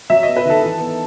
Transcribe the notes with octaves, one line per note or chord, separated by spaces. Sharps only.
F#3 E5
D#5
B3
B4
D#3 A4
E3
B3